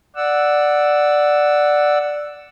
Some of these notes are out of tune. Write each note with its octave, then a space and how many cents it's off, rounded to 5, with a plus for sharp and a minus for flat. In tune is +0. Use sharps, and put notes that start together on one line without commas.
D5 +5 F#5 +0 E6 +0